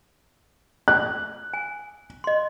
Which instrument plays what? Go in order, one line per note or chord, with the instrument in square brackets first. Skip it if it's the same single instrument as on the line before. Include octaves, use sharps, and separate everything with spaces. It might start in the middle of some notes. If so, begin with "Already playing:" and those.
[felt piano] F#6
[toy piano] G#5
D#5 C6